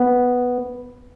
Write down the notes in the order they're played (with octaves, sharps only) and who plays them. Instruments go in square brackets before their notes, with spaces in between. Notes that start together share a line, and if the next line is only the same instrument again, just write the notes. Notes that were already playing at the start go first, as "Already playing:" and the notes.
Already playing: [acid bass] B3